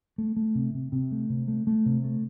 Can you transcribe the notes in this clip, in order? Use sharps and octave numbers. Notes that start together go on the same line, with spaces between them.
A3
A3
C3
C3
C3
A3
C3
A3
A3
C3
A3